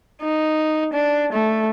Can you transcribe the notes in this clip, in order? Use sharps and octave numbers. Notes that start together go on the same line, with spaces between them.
D#4
D4
A3